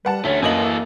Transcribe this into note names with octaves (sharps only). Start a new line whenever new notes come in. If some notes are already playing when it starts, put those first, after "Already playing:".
G3 B4 F#5 A5
D2 A3 C#4 C#5
F#2 E3 A#3 A4 D#5 F#7